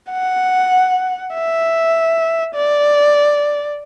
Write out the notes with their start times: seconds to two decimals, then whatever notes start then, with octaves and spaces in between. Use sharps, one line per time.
0.11 F#5
1.34 E5
2.55 D5